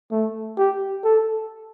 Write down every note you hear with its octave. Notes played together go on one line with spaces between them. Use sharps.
A3
G4
A4